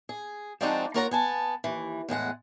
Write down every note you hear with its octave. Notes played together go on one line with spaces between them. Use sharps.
G#4
F3 G#3 C4 D4 D#4 F#4
A#3 F4 A#4 C#5 F#5 A#5
B3 G#5 A5
D#2 E3
E2 A2 G#3 F#5